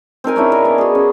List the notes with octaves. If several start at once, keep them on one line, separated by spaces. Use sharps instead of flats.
C4 D#4 A#4 G#5
C#4 D4 E4 C#5
A#4
B3 D5 D#5
F#4 G#4
C#4